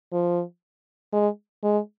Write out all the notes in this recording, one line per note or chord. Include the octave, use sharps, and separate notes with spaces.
F3
G#3
G#3